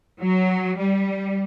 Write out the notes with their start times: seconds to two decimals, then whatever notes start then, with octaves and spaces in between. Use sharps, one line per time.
0.22 F#3
0.78 G3